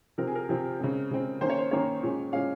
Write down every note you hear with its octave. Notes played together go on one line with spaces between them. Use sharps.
C3 F3 C4 A#4
G#4
A#4
C3 F3 C4
C#3 G#3 C4
C#3 G#3 C4
D#3 A#3 C#4 C5
C#5
C5
D#3 A#3 C#4 C#5
A#2 G#3 C#4
A#2 G#3 C#4 F5